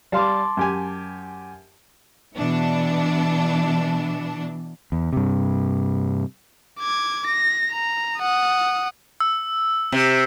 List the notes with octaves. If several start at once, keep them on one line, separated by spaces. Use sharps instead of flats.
G3 F5 A5 C6 D6
F#2 G4 G#5
B2 E3 D4
E2
G2 C3
D6 G#6
A#6
A#5
F#5 D#6
E6
C3